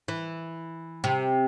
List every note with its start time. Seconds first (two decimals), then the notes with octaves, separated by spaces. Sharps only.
0.08 E3
1.04 C3